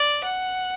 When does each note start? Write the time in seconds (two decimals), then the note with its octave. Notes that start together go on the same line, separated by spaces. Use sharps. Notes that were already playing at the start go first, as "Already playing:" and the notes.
Already playing: D5
0.23 F#5